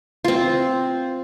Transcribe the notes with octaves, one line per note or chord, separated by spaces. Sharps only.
C4 F4